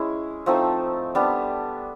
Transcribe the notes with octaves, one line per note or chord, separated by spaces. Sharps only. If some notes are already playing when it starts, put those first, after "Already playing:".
Already playing: G#3 C#4 E4 G#4
F3 A3 C4 D#4
G3 B3 D4